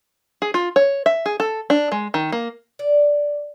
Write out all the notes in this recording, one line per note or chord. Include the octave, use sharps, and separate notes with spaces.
G#4
F4
C#5
E5
G#4
A4
D4
G#3
D#3
A#3
D5